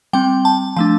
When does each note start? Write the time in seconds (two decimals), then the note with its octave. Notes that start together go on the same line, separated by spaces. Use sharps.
0.13 G3 C4 G5
0.45 A5
0.76 F3 A3 D4 A5